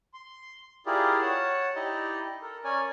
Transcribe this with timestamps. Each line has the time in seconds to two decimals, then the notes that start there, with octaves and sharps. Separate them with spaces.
0.14 C6
0.86 E4 F4 G4 G#4 A#4 D5
1.21 C#5 F#5 A5
1.75 D#4 E4 G4 D5 D#5
2.42 A4 A#4
2.64 C#4 A#4 C#5 D5 G#5